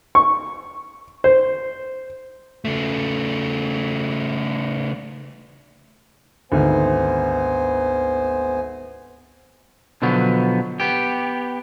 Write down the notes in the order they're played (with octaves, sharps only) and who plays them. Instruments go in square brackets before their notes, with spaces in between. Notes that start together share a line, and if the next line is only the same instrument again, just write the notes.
[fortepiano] C#6
C5
[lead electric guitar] C#3 A3
[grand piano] G#1 D2 [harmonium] B3 C5 G#5
[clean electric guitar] B2 D3 F3 F#3 B3
B3 G4